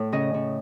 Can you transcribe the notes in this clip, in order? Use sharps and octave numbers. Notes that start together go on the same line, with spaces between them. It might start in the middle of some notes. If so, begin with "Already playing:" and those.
Already playing: A2 A4 C#5
C#3 D#5
C#3